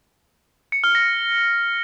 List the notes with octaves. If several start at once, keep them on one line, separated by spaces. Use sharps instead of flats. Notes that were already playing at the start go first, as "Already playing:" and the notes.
C#7
F6
A#6